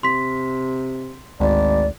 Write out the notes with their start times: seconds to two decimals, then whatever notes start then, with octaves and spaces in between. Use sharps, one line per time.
0.03 C3 C6 B6
1.40 G#1 D2 D5